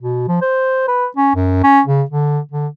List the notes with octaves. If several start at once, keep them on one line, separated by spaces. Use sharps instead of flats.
B2
F3
C5
B4
C#4
F#2
C#4
C#3
D3
D3